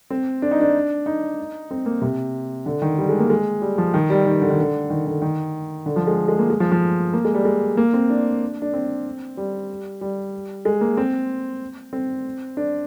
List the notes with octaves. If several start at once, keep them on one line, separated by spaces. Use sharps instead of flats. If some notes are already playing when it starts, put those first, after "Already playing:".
C4
D4
D#4
D4
D#4
C4
A#3
C3
D3
D#3
G3
G#3
A#3
G#3
G3
F3
D#3
G3
D#3
D3
D#3
D3
D#3
D3
D#3
D3
F3
G#3
G#3
A#3
G#3
F3
F3
A#3
G#3
G3
G#3
A#3
C4
D4
D4
C4
G3
G3
G#3
A#3
C4
C4
D4